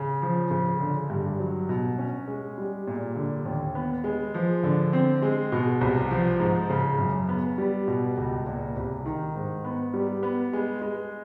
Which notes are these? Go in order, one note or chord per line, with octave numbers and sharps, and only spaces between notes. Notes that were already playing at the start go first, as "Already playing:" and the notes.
Already playing: C#3
F3
C#3
D3
G2
F#3
B2
C#4
G#3
G3
A#2
D3
D#2
B3
G#3
F3
D3
C4
G#3
B2
C2
F3
G#2
C#3
F#2
B3
G3
B2
C#2
A#2
C2
D#3
G#2
B3
G3
B3
G#3
G#3